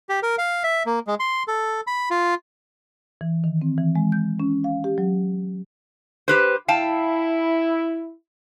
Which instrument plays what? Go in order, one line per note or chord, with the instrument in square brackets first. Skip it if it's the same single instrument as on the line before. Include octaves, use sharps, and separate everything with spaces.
[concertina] G4
A#4
F5
E5
A#3
G#3
C6
A4
B5
F4
[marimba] E3
D#3
C4
E3
G#3
G6
C#4
F5
G4
F#3
[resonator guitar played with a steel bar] G4 B4 C5
[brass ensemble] E4 [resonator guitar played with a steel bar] F5 G5 A5